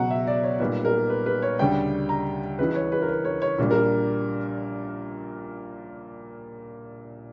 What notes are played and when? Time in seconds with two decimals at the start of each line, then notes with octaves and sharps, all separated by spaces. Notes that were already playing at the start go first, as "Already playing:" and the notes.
Already playing: C#2 B2 F#3 F#5 A#5
0.10 E5
0.27 D5
0.43 C#5
0.60 B1 A#2 G3 B4
0.85 A#4
1.10 B4
1.26 B4
1.42 C#5
1.59 D2 C#3 G3 G5
2.09 A#5
2.59 C#2 C#3 E3 B4
2.75 C#5
2.92 B4
3.02 A#4
3.09 B4
3.25 C#5
3.42 C#5
3.58 A#1 A#2 G3
3.71 A#4